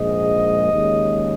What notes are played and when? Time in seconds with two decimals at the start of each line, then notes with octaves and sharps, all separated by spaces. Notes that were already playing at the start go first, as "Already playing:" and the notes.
Already playing: A#1 G#2 G#3 D#5
0.73 D#2 C#3 G#3